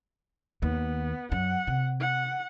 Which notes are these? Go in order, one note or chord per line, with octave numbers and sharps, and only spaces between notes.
D#2 B3
F#2 F#5
C3
F#5